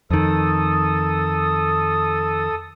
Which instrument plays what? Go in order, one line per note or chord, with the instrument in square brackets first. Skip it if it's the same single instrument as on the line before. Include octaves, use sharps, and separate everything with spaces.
[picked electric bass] F2 D#3 [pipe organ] A4 D#6